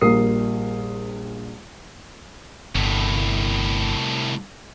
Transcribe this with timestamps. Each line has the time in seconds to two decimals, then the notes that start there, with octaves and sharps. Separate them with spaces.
0.01 A#1 G3 A#4 D#6 C7
2.75 G1 C2 A2